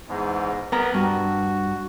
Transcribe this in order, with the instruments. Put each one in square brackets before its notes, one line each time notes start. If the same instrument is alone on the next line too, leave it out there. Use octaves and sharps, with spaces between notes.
[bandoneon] E2 G#2
[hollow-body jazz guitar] B3 A#5 [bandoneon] A#4
[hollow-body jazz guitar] G2 [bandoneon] F#4